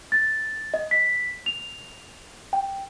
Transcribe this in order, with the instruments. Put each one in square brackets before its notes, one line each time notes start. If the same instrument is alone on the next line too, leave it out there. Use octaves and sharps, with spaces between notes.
[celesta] A6
D#5
B6
F7
G5